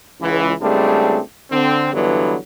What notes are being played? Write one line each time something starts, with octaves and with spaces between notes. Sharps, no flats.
C#2 E3
C#2 G3 A3 C4 D4 G#4
D3 C4
G2 D3 E3 F#3 B3